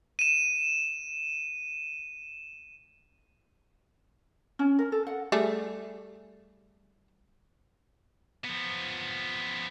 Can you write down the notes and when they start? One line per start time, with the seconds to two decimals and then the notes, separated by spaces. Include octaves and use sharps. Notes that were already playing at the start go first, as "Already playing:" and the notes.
0.19 D#7 E7
4.59 C#4
4.79 A#4
4.92 A4
5.07 F#5
5.32 G3 A3 G#4
8.45 F3 B3